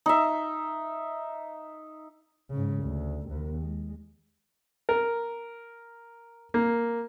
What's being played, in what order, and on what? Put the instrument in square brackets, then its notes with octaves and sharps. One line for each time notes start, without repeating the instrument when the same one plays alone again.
[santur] D#4 E5
[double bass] G#2 C#3
D2
D#2
G#3
[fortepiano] A#4
A#3